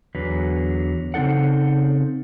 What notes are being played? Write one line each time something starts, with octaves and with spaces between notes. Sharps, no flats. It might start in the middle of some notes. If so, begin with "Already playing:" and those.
E2 D3 F#3 B4
C#3 C4 D#4 A4 F#5